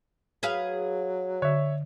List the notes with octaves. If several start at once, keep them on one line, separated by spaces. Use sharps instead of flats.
F#3 G#4 B4 F5
D3 C#5 E5